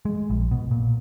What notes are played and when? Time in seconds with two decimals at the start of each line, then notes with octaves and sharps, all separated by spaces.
0.05 G#3
0.30 A#1
0.51 B2
0.71 A#2